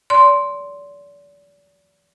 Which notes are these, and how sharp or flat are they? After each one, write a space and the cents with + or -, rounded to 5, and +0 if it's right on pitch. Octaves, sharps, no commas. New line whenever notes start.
D5 -35 C6 +0